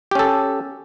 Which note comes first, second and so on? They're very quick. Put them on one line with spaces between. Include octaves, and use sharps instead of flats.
G4 C#4 A4